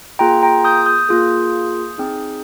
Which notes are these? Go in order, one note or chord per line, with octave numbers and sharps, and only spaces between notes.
A#3 F4 G#4 G5 A#5
G5 A#5
D#6 G6
D#6 G6
A#3 F4 G#4
C4 D#4 G#4